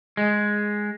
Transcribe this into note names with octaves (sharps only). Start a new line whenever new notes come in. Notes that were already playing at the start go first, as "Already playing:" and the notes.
G#3